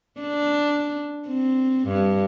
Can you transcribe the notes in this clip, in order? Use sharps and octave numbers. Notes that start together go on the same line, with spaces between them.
D4
C4
G2